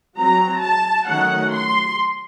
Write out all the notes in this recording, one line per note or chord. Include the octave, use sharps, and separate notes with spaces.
F#3 C4 A#5
A5
D#3 F#3 A3 C#4 F#5
C6